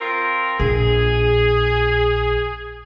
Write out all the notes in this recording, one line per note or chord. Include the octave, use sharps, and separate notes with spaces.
C4 F4 A#4
A#1 G#4